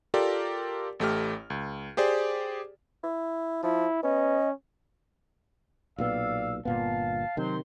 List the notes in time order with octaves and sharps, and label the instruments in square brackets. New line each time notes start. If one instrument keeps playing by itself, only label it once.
[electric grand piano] F4 G4 A4 A#4 D5
A1 A3 G4 F6
C#2
G4 G#4 C5 D5
[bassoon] E4
[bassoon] F3 [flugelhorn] E4
[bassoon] B3 [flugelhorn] C#4 [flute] D#5
[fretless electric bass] B1 A#2 B3 [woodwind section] D5 F5 E6
[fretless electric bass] G1 A#2 B3 [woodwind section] F5 A5
[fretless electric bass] C3 D#3 [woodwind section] F#3 C5 C6